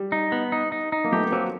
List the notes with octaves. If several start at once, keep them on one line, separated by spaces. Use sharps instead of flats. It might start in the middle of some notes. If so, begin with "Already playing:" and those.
Already playing: G3
D#4
B3
D#4
D#4
D#4
A#3
A3 B3 G4
B3
F#3 A#3 C4